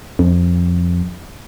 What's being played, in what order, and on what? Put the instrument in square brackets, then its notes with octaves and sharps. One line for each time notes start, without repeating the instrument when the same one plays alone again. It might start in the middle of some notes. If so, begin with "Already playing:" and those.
[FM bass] F2